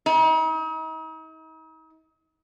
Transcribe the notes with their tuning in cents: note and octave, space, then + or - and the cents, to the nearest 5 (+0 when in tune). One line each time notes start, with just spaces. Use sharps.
D#4 +40